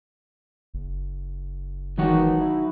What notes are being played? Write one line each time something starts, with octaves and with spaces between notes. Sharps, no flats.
F#1
D#3 E3 F#3 G#3 D#4 F#4
E4